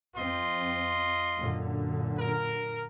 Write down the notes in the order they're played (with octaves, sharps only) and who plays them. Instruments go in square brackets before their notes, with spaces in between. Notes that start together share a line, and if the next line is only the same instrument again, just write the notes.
[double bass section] F2 C4 [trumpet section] F4 D#5 C6
[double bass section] F#2 A#2 D3
[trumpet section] A#4